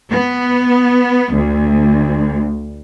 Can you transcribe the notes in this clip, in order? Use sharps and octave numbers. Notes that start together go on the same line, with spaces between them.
B3
D2